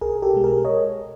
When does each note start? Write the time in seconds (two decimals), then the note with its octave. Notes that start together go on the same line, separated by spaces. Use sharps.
0.01 B1 G#4 A#4
0.22 G4 A4
0.34 B2 G#3
0.44 G#4 A#4
0.65 C#5 D#5